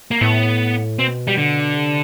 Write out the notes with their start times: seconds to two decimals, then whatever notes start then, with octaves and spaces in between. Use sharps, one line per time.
0.11 A#3
0.21 A2 B3
0.99 B2 C4
1.27 G3
1.37 D3
1.76 C3